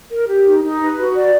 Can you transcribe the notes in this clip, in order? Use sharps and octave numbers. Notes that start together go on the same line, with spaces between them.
A#4
G4
D#4
D#4
B4
F#4
D5